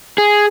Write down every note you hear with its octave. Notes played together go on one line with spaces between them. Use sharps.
G#4